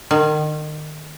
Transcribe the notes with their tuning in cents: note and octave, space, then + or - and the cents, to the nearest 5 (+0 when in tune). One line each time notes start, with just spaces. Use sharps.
D#3 -30 G#5 +30